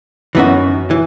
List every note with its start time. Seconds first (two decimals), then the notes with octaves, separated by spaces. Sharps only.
0.35 F#2 E3 B3 D#4 F#4
0.91 E3